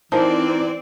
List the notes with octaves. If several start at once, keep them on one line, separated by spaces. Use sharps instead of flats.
E3 F3 C4 D#4 A#4 D5 G#5